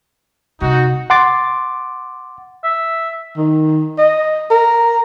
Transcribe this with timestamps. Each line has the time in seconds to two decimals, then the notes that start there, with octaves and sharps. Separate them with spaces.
0.61 C3 G#3 D#4 F#4
1.10 F#5 C6 D6 A6
2.64 E5
3.37 D#3
3.99 D#5
4.51 A#4